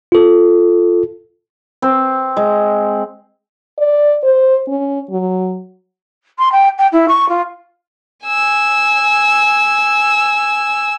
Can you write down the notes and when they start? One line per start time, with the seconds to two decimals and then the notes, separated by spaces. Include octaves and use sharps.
0.12 F4 A4
1.82 C4
2.37 G#3
3.78 D5
4.23 C5
4.68 C#4
5.11 F#3
6.38 C6
6.52 G5
6.78 G5
6.92 E4
7.08 C#6
7.29 F4
8.26 G#5 E6